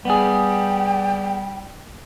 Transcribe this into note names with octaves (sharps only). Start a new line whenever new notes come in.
G3 B3 G#4 G5